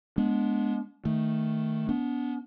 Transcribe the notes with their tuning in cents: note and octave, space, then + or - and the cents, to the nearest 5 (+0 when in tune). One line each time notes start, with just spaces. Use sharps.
G#3 +10 B3 -20 D4 -25
D#3 +0 A3 +0
B3 +0 D4 -35